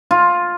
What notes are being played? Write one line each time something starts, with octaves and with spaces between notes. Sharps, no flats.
F4